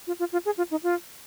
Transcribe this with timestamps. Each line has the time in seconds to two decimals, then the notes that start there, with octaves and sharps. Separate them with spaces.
0.07 F4
0.19 F4
0.32 F4
0.45 G#4
0.57 F4
0.71 D#4
0.83 F4